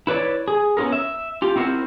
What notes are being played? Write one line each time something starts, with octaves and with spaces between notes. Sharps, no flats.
E4 B4 C#5 D5
G#4
B3 C#4 F4 A4 A#4
E5
F4 G4
C4 E4 F#4 G#4 A#4 C5